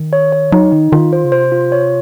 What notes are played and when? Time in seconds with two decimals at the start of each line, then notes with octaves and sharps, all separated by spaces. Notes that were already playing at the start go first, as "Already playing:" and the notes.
Already playing: D#3
0.13 C#5
0.33 C#5
0.52 F#3 D#4
0.72 D#3 D#4
0.92 D#3 F4
1.13 C5
1.25 C#3
1.32 C3 C5
1.52 F4
1.72 C#5